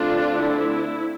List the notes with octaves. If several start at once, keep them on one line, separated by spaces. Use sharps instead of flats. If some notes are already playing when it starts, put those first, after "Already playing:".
Already playing: D3 A3 C4 D4 F4
E4